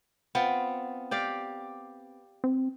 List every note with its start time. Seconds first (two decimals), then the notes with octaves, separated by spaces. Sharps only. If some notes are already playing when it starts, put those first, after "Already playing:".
0.35 B3 C4 F4
1.11 G4 D5 F5
2.44 C4